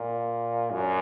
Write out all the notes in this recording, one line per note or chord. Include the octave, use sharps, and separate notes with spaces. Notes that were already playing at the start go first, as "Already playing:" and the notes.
Already playing: A#2
F#2